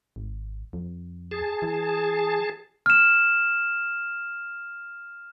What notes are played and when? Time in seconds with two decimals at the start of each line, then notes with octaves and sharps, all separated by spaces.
0.16 G#1
0.73 F2
1.31 G#4 A5
1.62 E3
2.86 F6 E7